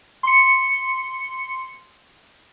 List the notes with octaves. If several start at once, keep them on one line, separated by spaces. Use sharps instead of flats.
C6 C#7